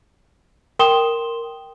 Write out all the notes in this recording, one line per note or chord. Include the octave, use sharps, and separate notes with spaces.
A#4 G5 C6 D#6 E7 G7